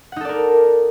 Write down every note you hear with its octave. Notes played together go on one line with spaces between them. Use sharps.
D#4 A4 A#4 D5 F#5